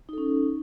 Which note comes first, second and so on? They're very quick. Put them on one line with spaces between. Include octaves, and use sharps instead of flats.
D#4 A4 C#4